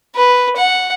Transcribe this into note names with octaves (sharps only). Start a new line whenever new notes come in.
B4
F#5